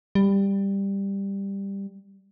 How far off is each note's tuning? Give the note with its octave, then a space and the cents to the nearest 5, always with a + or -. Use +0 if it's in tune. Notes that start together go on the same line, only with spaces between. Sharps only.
G3 +10